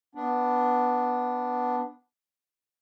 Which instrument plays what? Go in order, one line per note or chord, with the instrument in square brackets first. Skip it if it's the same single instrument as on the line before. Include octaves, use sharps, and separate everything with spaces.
[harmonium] B3 D4